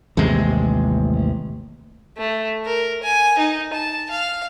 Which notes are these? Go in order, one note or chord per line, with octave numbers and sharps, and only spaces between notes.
A1 D#2 C3 G#3
A3
A#4
G#5
D#4
A5
F5